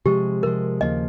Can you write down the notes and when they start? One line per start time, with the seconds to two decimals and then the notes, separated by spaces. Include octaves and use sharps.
0.05 C3 F3 G#3 G4
0.43 C3 F3 G#3 A#4
0.81 D#2 C#3 F3 A#3 D#5